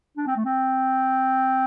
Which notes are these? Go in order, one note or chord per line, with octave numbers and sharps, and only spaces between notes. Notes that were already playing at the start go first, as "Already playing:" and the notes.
D4
C4
A3
C4